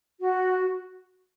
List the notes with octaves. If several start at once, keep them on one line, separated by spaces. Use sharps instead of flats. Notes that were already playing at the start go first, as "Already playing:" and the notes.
F#4